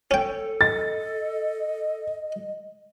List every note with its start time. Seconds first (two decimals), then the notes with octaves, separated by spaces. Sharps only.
0.11 C#4 A4 G5
0.61 D#5 A6